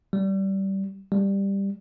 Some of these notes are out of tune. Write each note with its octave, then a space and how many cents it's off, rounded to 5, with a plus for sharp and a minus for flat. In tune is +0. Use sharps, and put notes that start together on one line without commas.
G3 -20
G3 +10